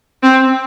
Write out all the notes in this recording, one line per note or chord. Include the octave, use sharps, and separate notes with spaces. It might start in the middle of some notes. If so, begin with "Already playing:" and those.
C4